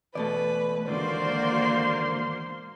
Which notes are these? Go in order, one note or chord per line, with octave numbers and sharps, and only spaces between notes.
E2 B2 A3 A4 B4 D5
D#2 G#2 D3 A#3 F#4 C5 D5 C6